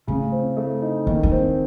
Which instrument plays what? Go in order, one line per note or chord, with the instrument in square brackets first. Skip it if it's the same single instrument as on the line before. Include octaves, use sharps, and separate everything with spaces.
[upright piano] C#3 [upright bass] A3
[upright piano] C4
A3
D#4
[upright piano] D#3 [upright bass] A#3
[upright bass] A3
[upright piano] C4